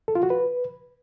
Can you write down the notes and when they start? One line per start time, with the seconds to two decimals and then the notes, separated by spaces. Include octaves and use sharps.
0.08 A4
0.15 F4
0.23 F#4
0.30 B4